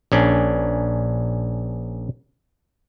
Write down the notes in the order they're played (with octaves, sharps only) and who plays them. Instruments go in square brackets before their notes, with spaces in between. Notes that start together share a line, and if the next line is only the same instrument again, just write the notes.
[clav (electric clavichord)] A#1 C#4 D4